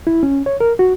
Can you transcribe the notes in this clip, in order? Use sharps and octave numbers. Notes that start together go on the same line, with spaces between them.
E4
C#4
C#5
A#4
F#4